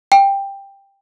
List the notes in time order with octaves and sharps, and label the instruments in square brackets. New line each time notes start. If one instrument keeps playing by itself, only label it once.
[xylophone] G5